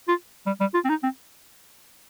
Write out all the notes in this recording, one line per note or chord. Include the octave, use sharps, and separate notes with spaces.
F4
G3
G3
F4
C4
D#4
C4